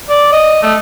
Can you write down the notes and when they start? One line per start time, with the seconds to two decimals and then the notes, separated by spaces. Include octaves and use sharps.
0.10 D5
0.32 D#5
0.63 A3